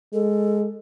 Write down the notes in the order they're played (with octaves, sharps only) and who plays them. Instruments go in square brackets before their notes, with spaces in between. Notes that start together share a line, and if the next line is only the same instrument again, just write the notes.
[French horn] G#3 [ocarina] A4